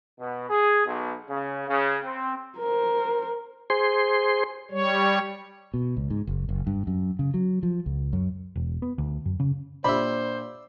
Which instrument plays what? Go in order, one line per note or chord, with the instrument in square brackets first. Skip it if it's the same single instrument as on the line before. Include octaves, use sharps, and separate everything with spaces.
[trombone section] B2
G#4
B1
C#3
C#3
C4
[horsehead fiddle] A#4 C5
[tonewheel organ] G#4 C5 C6
[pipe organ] G3 C#5
[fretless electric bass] B2
C#2
G#2
F#1
F#1
G2
F#2
C#3
F#3
F3
C#2
F#2
[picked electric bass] E1
B3
D2
F#2
C#3
[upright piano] A#2 D4 G4 [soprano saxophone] C5 [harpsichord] D5 E5 [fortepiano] B5